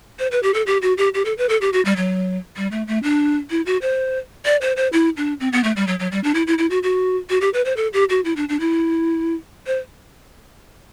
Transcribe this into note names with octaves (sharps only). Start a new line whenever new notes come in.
C5
B4
G4
A4
G4
F#4
G4
G4
A4
B4
A4
G4
F#4
G3
F#3
G3
A3
A3
D4
E4
F#4
C5
D5
C5
C5
E4
D4
C4
B3
A3
G3
F#3
F#3
G3
D4
E4
E4
E4
F#4
F#4
F#4
G4
B4
C5
A4
G4
F#4
E4
D4
D4
E4
C5